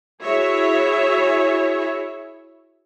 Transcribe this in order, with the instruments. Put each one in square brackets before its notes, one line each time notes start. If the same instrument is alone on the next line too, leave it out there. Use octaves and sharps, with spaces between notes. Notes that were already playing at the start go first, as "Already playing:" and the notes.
[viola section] E4 F#4 G#4 C#5 E5